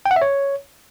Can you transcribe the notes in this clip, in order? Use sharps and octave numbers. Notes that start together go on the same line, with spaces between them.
G5
F#5
E5
C#5